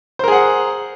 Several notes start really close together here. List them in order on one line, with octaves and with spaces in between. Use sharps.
C5 A#4 G#4 F#5